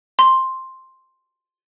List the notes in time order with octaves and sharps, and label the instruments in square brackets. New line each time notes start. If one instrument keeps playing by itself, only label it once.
[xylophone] C6